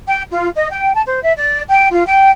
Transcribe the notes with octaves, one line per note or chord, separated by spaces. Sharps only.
G5
F4
D#5
G5
A5
C5
E5
D5
G5
F4
G5